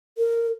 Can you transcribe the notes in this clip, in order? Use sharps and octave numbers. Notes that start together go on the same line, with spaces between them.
A#4